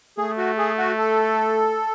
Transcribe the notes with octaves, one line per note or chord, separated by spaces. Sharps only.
A3 G#4
F#4
G#4
F#4
A4